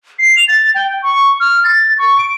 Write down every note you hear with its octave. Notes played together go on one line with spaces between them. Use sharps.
C7
F7
A6
G5
C#6
F6
A6
C#6
D7